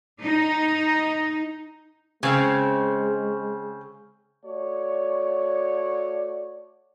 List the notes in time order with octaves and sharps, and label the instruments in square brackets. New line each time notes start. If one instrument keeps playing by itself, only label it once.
[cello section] D#4
[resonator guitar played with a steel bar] C#3 C4 [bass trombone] G#3
[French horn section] A3 F#4 D5 [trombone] C#5